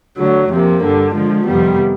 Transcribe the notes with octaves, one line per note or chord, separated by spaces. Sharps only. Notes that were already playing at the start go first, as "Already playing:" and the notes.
D3 F#3 A3
F2 C3 F3 A#3
G2 D3 G3
D3 F3 G#3
F2 C3 D#3 G3 B3